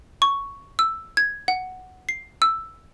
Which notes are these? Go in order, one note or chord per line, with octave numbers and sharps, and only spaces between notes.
C#6
E6
G#6
F#5
C7
E6